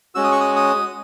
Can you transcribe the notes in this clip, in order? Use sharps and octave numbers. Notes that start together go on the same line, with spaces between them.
G#3 C#4 F#4 E6
D#6
C#6
D#6
D#6